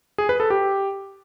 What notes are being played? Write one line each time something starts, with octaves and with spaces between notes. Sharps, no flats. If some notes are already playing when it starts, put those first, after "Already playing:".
G#4
B4
A4
G4